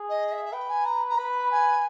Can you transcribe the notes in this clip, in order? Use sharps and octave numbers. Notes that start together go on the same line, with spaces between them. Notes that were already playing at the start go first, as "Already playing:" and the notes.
Already playing: G#4
D#5
E5
E5
B4 G5
G#5
A#5
A#5
B4 B5
G#5